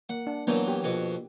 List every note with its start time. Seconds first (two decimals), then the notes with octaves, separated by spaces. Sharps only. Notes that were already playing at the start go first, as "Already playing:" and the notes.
0.09 A#3 F#5
0.27 D4
0.47 E3 F#3 A#3 B3 D4
0.68 G4
0.84 F2 B2